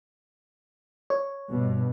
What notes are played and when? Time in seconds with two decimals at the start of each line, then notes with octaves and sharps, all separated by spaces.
1.10 C#5
1.51 G2 B2